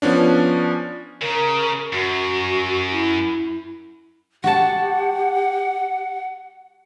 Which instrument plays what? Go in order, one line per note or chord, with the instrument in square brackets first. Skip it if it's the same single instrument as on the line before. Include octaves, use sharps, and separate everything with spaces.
[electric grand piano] F3 B3 C#4 D4
[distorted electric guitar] C#3 [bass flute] A#4
[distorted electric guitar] F#2 [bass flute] F#4
[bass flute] E4
[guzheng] F#4 A5 [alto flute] G4 [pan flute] F#5